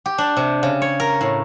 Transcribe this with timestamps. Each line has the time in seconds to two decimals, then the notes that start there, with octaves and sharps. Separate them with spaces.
0.06 G4
0.18 D4
0.37 C3
0.63 C#3
0.82 C#5
1.00 A#4
1.21 A2